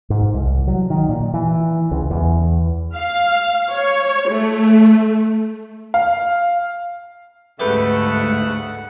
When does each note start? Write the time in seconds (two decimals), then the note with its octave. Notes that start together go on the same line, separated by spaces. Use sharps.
0.10 G#2
0.34 C2
0.67 F#3
0.90 D#3
1.09 A#2
1.34 E3
1.91 C#2
2.11 E2
2.97 F5
3.71 C#5
4.29 A3
5.94 F5
7.60 D2 G#2 C#3 A3 G4 B4 F#5 G5